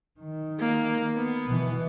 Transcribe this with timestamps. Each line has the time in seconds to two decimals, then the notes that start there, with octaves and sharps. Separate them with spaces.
0.20 D#3
0.60 A#3
1.16 B3
1.47 B2 E3